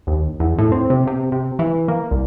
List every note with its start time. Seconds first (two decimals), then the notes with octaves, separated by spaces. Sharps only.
0.07 D#2
0.40 E2
0.59 A2
0.72 C4
0.90 C3
1.07 C3
1.32 C3
1.59 E3
1.88 A#3
2.11 C2